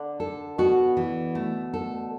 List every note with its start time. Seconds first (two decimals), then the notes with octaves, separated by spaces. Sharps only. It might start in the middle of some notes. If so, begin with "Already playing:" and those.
Already playing: D3
0.20 A4
0.58 B2 F#4
0.97 E3
1.35 A3
1.73 A4